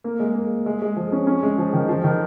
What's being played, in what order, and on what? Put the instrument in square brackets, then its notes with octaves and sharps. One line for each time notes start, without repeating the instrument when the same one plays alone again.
[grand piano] A#3
G#3
A#3
G#3
G#3
F3
C#4
C#4
G#3
F3
D#3
F3
D#3